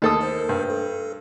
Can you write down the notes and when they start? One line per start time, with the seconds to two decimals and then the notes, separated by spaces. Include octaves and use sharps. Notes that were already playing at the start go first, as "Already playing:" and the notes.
0.02 D#2 D#4 A4 D#6
0.21 A#4 C5
0.49 G2
0.70 A4